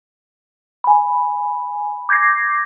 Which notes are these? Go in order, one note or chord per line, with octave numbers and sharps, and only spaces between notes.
G#5 B5
D6 G6 G#6 A#6 C7